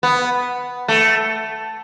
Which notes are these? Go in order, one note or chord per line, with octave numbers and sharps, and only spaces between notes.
B3
A3